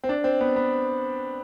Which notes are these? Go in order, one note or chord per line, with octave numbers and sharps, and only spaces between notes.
C4
D4
C4
B3
B3